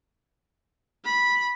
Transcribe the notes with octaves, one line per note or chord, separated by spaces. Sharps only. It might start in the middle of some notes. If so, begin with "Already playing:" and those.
B5